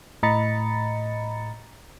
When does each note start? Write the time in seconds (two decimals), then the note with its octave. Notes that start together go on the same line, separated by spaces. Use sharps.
0.23 A2 D#5 A#5 B5 A6 C#7